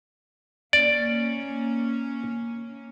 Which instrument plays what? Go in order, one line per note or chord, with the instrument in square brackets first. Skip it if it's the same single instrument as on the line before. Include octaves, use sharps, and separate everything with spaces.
[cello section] A#3 C#4 [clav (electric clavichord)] D5